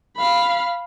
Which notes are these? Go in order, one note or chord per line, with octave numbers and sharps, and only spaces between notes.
F5 B5